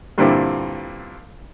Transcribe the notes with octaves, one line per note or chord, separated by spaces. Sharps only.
G2 A#2 D3 G3 C4 E4